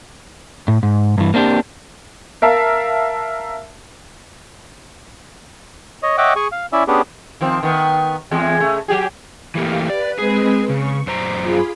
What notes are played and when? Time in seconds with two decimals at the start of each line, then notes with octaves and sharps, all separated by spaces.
0.68 A2
0.83 G#2
1.18 G2 E3
1.34 A#3 C4 D4 F#4 G4
2.42 A#4 E5 F5 A5
6.03 C#5 D#5
6.18 C#5 D#5 E5 F#5 G5 D6
6.36 G#4 G#5 C#6
6.52 F5
6.73 C#4 E4 D5 E5
6.88 B3 C#4 D4 G4 G#4
7.41 D#3 F3 C4
7.63 D#3 B3
8.31 E2 G#3
8.60 C#3 A3
8.88 F#3 G4 G#4
9.55 E3 A3 A#3 G4 F5
9.90 B4 D5
10.19 G#3 C4 G#4 B4
10.69 C#3 C#6
11.07 F#2 C5 A#5 D6
11.42 F4 G#4 B5